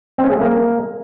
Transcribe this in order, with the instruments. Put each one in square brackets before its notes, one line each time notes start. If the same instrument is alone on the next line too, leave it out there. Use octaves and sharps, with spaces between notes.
[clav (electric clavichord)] C4
C#4
G#4
A3
A#3